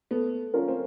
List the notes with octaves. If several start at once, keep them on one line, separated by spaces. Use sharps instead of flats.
A3 B3
C#4 F4 A#4
C4